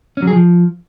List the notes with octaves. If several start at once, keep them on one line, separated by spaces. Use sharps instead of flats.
C#4
F#3
G#4
F3